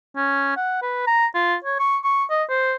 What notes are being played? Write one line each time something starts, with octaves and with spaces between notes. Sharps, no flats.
C#4
F#5
B4
A#5
F4
C#5
C#6
C#6
D#5
C5